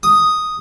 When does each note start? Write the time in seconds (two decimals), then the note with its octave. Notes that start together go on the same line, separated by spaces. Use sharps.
0.03 D#6